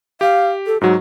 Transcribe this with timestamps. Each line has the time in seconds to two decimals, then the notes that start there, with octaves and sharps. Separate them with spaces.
0.21 G4 F5
0.66 A4
0.81 G#2 F#3 F#4